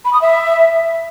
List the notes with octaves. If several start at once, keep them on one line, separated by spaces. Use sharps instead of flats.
B5
D#6
E5